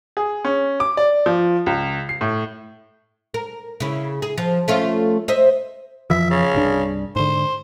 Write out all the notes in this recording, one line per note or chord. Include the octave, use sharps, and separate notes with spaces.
G#4
C#4
D6
D5
F3
C#2
C7
A2
A#4
C#3 E4
G#4
F3
A3 C#4 F4
C5 D#5 E5
F2 E3 F3 E5
C#3
C2 G2 D4
G#2 D3 C5